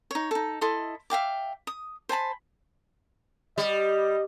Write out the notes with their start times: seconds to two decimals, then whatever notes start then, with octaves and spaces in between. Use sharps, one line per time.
0.11 D#4 C#5
0.31 D#4 A4
0.61 E4 A4 D#5 C6
1.10 E5 F5 G5 D6
1.67 D#6
2.09 C5 G#5 A5 B5
3.58 G3 D#5